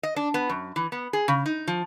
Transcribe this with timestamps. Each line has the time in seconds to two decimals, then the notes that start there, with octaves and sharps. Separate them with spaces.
0.03 D#5
0.16 D4
0.34 B3
0.50 F#2
0.76 E3
0.92 B3
1.13 G#4
1.28 C#3
1.46 D#4
1.68 F3